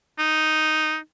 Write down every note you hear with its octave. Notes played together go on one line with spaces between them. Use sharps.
D#4